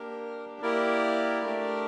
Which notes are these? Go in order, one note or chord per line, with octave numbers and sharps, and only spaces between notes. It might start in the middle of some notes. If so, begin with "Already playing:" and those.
Already playing: A#3 D4 G4 A#4
A#3 E4 G4 A#4 D5
A3 D4 G4